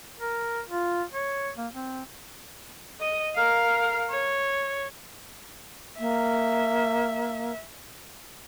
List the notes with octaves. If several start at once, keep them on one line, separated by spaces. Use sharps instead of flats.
A#4
F4
C#5
A#3
C4
D#5
A#4 F5
C#5
A#3 E5